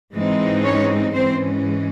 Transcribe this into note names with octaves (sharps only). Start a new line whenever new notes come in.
G#2 E3 G#3 C4 D#4
C#4 C#5
G#2 E3 G#3 C4 C#4 C5